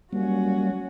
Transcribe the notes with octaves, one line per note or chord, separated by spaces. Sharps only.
F#3 G3 A#3 C#4 F#4